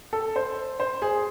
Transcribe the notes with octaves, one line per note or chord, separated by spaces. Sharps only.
A4
C5
C5
G#4